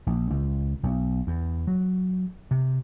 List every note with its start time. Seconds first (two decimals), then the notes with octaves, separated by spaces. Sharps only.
0.07 A#1
0.30 C#2
0.83 B1
1.27 E2
1.67 F#3
2.51 C3